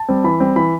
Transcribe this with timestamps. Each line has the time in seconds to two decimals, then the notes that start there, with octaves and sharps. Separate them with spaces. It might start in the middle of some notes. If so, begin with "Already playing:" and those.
Already playing: A5
0.09 G3 C4
0.24 E3 B5
0.40 G3 C4
0.56 E3 B5